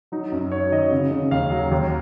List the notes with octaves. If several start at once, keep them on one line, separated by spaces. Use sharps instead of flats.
F#3 D#4
F#2
F#3 C#5
D#3 D#5
C#3
C#3
D#2 F5
F#3
D#2